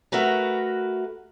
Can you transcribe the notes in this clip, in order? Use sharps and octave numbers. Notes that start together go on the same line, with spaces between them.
A3 F#4 A#4 B4 A#5